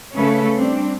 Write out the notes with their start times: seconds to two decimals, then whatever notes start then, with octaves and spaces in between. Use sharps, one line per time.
0.16 C#3 A3 C#4 A4 B4
0.57 G3 C4 D4